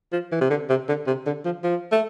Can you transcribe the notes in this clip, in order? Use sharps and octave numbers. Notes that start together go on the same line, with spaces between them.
F3
E3
C3
D3
C3
D3
C3
D3
F3
F3
A3